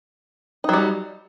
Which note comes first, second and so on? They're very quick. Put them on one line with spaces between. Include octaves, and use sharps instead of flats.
D#4 F#3 G3